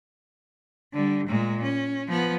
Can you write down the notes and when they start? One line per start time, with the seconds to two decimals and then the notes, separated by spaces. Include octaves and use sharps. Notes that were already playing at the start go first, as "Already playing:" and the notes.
0.93 D3 G3
1.27 A#2 G#3
1.62 C#4
2.08 F3 B3